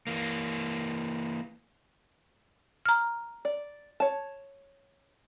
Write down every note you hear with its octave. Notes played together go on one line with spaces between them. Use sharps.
E3 A#3
A#5 F6
D5
C#5 A5